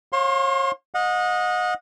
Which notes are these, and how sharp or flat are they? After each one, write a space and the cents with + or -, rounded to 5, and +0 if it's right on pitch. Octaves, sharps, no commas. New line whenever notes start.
C#5 -35 F5 +25 C6 +20
D#5 +0 F#5 -35